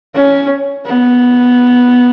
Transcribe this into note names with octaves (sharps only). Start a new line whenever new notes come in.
C#4
B3